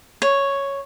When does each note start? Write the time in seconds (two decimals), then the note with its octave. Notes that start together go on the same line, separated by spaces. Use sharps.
0.22 C#5